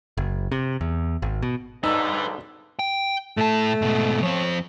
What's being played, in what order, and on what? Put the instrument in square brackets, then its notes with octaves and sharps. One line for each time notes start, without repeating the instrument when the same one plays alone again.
[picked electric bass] F#1
C3
E2
G#1
B2
[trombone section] B1 G#2 D3 [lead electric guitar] G3 B4 [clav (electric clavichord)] D#4 [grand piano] E6
[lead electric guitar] G5
[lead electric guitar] A2 A5 [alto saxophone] A3
[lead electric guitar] G#2 B2
[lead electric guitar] F2 C4 [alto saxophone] C#5